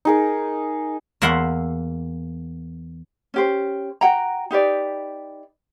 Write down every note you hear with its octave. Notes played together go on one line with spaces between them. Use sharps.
D#4 G#4 A#4
E2 A#3 E5 F#5 C6
C#4 G4 C5
F#4 F#5 G5 A#5
D#4 G4 B4 D5